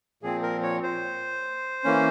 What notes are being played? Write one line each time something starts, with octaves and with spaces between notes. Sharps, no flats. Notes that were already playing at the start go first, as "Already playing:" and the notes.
A#2 F3 C4 G#4
A#4
C#5
C5
E3 A#3 C#4